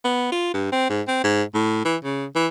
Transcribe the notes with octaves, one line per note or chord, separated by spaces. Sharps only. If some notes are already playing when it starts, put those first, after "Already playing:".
B3
F4
G2
C4
G#2
C4
G#2
A2
E3
C#3
E3